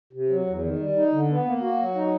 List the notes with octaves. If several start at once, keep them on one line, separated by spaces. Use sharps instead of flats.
C3
F#3
E2
D#3
G3
D#4
D3
B3
A#3
F#4
F#3
D#4